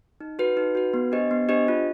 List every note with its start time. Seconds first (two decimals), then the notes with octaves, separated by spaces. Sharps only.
0.20 D#4
0.39 F#4 B4
0.57 D#4
0.75 F#4 B4
0.94 B3
1.12 D4 G4 C5 D#5
1.31 B3
1.49 D4 G4 C5 D#5
1.68 F4